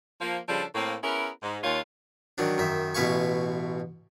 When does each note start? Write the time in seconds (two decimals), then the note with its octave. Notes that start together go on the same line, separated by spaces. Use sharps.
0.21 F3 A#3
0.48 C#3 F3 G3 D4 F4 A4
0.75 A2 A#3 C4
1.03 B3 C#4 E4 G#4 A#4
1.43 G#2
1.64 D#2 F4 C#5
2.38 D#3 F#3 D4
2.58 F#2 D#3 E5
2.95 A1 B2 E5 F5 G#5 C#6